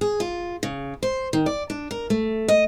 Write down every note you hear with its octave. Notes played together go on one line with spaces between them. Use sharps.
G#4
F4
C#3
C5
D#3
D5
D4
A#4
A3
D#5